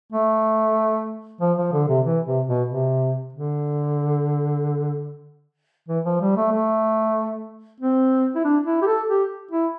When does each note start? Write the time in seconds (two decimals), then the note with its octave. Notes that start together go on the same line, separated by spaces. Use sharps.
0.12 A3
1.41 F3
1.58 F3
1.73 D3
1.88 C3
2.05 E3
2.26 C3
2.48 B2
2.69 C3
3.33 D3
5.88 E3
6.05 F3
6.21 G3
6.36 A3
6.52 A3
7.80 C4
8.36 E4
8.44 D4
8.65 E4
8.82 G4
8.87 A4
9.09 G4
9.51 E4